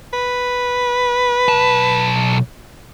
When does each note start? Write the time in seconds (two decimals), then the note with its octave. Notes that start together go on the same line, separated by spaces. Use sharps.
0.13 B4
1.49 B1 A5